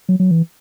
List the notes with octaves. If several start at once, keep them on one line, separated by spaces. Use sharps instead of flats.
F#3
F#3
E3